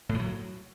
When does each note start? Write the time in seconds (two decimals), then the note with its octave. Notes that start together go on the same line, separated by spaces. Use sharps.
0.09 A2
0.14 D#3
0.20 F#3